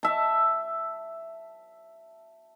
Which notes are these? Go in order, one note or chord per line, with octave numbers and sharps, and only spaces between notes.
E5 A5